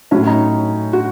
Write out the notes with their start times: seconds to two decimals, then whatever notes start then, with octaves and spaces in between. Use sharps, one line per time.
0.11 A2 F#3 C#4
0.27 D#4
0.93 F#4